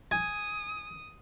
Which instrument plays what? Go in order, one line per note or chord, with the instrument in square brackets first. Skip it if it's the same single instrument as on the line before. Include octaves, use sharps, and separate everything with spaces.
[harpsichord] G#5 [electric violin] D#6